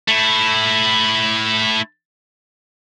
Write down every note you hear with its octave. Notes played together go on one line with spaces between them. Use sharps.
A3 E4